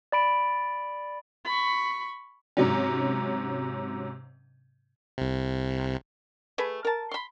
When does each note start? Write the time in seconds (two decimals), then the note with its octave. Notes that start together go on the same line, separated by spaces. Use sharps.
0.12 D5 B5 D7
1.45 B5 C#6
2.57 G#2 C3 F#3 C#4
5.18 C2 C3
6.58 A3 G#4 B4
6.85 A#4 A5
7.11 B5 C6